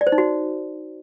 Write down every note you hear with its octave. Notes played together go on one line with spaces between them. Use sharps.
D5
C5
D#4
F#4